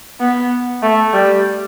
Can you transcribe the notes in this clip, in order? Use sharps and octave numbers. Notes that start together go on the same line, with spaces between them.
B3
A3
G3